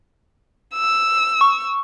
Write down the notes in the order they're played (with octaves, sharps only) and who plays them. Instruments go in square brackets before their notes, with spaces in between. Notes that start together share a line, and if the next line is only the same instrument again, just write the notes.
[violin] E6
[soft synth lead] C#6